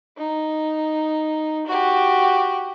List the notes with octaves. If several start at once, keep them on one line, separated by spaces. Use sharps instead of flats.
D#4
F#4 G4